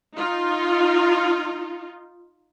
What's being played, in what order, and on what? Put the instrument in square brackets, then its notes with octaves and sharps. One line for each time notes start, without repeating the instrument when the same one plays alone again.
[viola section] D#4 F4